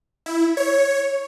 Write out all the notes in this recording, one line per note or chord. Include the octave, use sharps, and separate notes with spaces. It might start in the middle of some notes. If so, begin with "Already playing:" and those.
E4
C#5